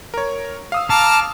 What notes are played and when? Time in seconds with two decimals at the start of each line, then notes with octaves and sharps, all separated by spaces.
0.14 A#4 C#5
0.72 F5 D#6 E6
0.90 A5 A#5 D6 F6